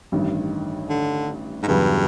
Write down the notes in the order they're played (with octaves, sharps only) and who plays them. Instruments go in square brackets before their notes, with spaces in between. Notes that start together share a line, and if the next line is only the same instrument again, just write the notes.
[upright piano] A1 G2 D#3
[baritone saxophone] D3
G#2
[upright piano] E2 C#3 F#3 B3 [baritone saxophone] G2